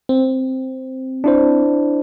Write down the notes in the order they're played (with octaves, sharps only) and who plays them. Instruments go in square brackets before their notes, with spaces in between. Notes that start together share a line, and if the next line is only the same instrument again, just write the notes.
[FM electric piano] C4
[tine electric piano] D4 E4 C5